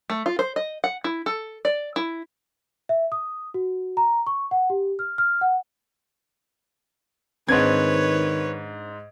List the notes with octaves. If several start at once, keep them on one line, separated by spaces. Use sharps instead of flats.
A3
F4
C5
D#5
F#5
E4
A4
D5
E4
E5
D#6
F#4
A#5
C#6
F#5
G4
F6
F6
F#5
G#2 D#3 C4 D4 B4 C#5 G#6